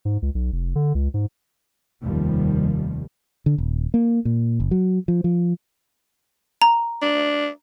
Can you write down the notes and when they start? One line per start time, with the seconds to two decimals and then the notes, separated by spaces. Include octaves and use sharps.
0.05 G#2
0.22 C#2
0.35 B1
0.52 F1
0.75 D3
0.95 C#2
1.14 G#2
2.03 F1 D#2 D#3 F3 G3
3.46 D3
3.58 D#1
3.94 A#3
4.25 A#2
4.60 F#1
4.71 F#3
5.08 F3
5.24 F3
6.62 A#5
7.02 D4